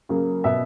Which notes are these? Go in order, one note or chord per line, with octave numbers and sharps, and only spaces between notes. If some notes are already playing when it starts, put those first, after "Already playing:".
C#3 F#3 A#3
B2 E5